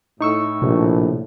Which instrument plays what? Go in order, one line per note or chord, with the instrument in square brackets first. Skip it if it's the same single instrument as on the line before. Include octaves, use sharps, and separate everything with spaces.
[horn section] A2 [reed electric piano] D#4 C#6 E6
[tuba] A#1 [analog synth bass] C3